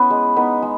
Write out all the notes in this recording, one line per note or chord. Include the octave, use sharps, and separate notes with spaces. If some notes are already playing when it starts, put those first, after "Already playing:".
Already playing: B3 C#4 E4 B4
G#3
B3 D#4 B4
G#3